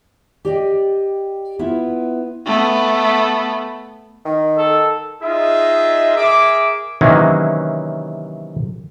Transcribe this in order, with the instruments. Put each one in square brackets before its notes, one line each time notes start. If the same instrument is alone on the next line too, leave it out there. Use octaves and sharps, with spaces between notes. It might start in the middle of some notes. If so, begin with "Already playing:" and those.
[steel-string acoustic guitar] G4 D5 D#5 G5
B3 E4 F4 E5
[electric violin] A3 B3
[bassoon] D#3
[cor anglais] A4
[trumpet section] D#4 F4 G#4 D#5 E5
G#4 A#4 E5 D6
[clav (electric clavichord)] C3 D#3 E3 F#3 A#3 C#4